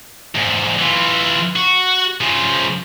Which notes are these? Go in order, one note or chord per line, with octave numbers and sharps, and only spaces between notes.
E2 G#2
E3 F4
F#4
C#3 F3